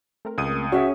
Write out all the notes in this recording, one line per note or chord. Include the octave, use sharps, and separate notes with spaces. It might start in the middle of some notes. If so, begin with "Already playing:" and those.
A3 C4 A#4
C#2 D#6 D#7
C#4 F#4 G#4 C#5 E5